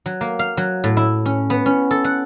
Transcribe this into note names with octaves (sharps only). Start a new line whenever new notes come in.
F#3
A#3
F5
F#3
A2
E4
C#4
B3
C#4
A4
F#5